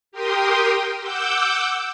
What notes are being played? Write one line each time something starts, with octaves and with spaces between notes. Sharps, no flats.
G4 A#4 G5 C6 D#6
F#5 D6 E6 G6